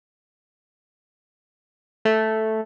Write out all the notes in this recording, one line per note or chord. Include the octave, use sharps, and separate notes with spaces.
A3